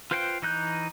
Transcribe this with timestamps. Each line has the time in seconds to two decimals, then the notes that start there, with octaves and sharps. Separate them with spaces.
0.11 F4 B4 C5 F5 G5
0.42 E3 D#4 F#6 G6